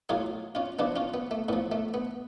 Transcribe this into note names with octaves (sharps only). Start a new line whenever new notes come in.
A2 F#3 F4 G#4
C#4 F4
C#3 F3 B3 D4
C#4 F4
B3
A3
A2 F3 B3
A3
B3